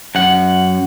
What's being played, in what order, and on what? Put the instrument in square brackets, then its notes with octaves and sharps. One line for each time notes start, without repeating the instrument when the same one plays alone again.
[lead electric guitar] F#2 F#5